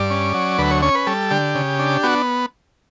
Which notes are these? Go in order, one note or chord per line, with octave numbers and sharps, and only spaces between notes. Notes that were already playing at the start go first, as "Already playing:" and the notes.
Already playing: G2 D5
C#4
F#3
D2 B4
C#5
C#4 C#5
B4
G3 A4
D3 G4
C#3
D4
B3 F#4